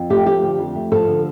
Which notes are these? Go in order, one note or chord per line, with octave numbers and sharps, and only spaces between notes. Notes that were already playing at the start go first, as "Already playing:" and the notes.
Already playing: F2
A3 G4
F3 G4
D3
F2
A3
F3 A4
D3